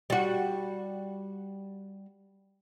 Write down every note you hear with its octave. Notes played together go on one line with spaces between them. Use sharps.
G3 F#4